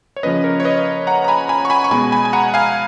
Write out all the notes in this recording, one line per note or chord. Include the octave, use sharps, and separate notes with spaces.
C#5
C#3 F3 A#3 C#4 B4 D#5
A#4 C#5
C#5
B4 D#5
F#5 A#5
A#5
G#5 B5
G#5 B5
C#6
G#5 B5
C#6
B2 G#3 B3 G#5 B5
G#5 B5
G#5
F#5 A#5
F5 G#5